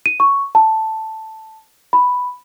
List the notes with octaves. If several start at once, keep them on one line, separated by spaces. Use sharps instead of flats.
D#7
C#6
A5
B5